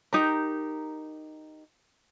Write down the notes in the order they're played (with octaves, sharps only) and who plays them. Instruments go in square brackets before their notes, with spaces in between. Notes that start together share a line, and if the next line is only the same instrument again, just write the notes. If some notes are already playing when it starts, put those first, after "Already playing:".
[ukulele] D#4 G4 A#4